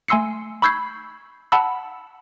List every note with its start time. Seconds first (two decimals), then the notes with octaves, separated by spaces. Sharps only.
0.08 A3 G#5 C6 E6 C7 C#7
0.62 B5 C#6 E6 G6 G#6 C7
1.52 F#5 A5 B5 E6